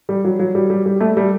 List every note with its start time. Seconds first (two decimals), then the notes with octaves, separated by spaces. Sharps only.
0.09 G3
0.24 F#3
0.39 F#3
0.55 G3
0.70 G3
0.86 G3
1.01 A3
1.17 G3